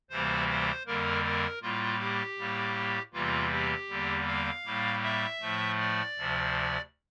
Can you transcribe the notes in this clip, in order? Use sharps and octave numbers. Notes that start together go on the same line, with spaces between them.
D2 C3 E3 G3 A#3 C5
C5
F2 D3 G3 A#3 A#4
A#4
A2 G3 A#3 F4
G4
A2 G3 A#3
E2 C3 E3 G3 A#3 F4
G4
E2 D3 G3 A#3
F5
A2 G3 A#3
E5
A2 F3 A3
D5
D2 C3 F3